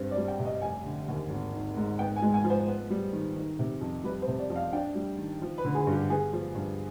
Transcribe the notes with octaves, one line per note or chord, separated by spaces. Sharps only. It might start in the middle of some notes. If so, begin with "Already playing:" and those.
Already playing: G2 C4
D5
G3
G5
C3
D#5
F1 G#5
D3
D#2
G#1
D#3
G#2
B3 G5
G#5
G#3
G#5
F3
C5
B3
G3
D#3
D#3
C3
F2
G3 B4
C5
C3
D5
F2
F5
D4 G5
G3
D#3
F3
B4
D3
G#4
G2
G4
B3 G#4
F3
G2